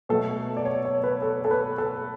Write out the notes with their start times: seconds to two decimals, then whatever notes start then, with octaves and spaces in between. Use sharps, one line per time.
0.09 B2 F#3 A3 A4
0.57 D5
0.65 C#5
0.85 C#5
1.04 B4
1.22 A4
1.45 A4
1.51 B4
1.78 A4